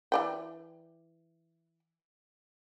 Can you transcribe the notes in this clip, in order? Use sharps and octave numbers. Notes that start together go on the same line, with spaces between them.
E3 D5 G5